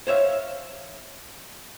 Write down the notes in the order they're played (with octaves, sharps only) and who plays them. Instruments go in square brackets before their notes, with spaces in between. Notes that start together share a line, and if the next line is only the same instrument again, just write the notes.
[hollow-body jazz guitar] C5 C#5 E5 F5